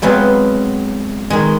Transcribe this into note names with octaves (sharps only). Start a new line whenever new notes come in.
F#3 G#3 B3 C4 F5
D#3 G#3